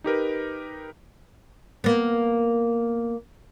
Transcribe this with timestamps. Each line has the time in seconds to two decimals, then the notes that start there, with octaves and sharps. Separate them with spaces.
0.04 D#4 G4 A#4 B4
1.84 A#3 B3